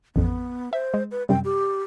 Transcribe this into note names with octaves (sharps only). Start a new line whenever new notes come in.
A1 F2 B3
C5 E5
G#3
B4
F#2 C3 G3 G5
G4